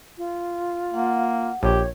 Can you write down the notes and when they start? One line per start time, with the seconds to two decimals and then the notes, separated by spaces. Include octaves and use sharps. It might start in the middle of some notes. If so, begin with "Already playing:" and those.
0.18 F4
0.94 A#3 F#5
1.63 A#1 G4 C#5